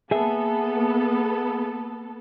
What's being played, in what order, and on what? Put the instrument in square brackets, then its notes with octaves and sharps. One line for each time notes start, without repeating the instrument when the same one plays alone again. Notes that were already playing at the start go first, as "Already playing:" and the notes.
[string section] A#3 B3 A4 [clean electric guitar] G#4 E5